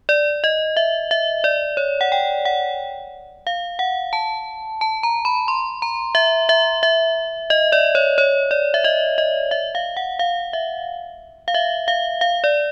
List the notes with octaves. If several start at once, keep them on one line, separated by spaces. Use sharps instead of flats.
D5
D#5
E5
E5
D5
C#5
F#5
G5
F#5
F5
F#5
A5
A5
A#5
B5
C6
A#5
E5
E5
E5
D#5
D5
C#5
C#5
D5
E5
D#5
D#5
E5
F5
F#5
F5
E5
F5
E5
F5
F5
D5